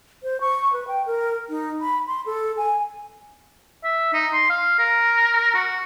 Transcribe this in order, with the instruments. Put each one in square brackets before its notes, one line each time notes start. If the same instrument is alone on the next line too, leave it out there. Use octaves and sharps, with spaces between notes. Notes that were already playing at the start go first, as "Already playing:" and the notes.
[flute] C5
C#6
B4
G5
A#4
D#4
B5
C6
A4
G#5
[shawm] E5
D#4
C6
F5
A#4
F#4